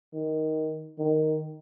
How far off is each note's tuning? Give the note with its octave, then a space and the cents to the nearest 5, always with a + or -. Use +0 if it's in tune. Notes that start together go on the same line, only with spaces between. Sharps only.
D#3 +10
D#3 +0